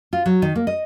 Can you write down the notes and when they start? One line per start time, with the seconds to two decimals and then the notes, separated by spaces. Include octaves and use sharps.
0.13 F4
0.26 F#3
0.42 D#3
0.56 A#3
0.67 D#5